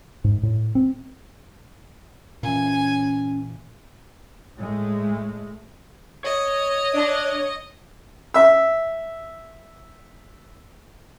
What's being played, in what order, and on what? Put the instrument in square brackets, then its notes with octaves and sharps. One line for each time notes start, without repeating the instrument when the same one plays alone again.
[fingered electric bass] G#2
A2
C4
[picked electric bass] A#2 E3 [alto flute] C#4 [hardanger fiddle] G#5
[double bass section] A2 G#3 A3
[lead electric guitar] C#5 [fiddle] D#5
[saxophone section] D4
[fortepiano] E5 E6